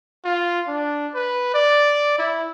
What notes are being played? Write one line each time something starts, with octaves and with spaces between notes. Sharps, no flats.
F4
D4
B4
D5
E4